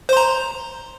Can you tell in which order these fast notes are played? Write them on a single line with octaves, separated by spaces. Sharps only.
C5 C6 A#5